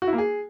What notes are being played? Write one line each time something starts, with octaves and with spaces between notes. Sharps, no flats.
F#4
E4
A#3
G#4